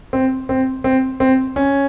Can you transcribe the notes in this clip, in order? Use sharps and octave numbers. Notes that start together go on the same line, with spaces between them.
C4
C4
C4
C4
C#4